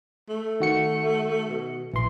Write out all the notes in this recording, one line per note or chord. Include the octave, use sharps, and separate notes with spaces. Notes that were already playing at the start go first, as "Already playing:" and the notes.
A3
D#3 F#4 C#7
B2
A#1 E3 C6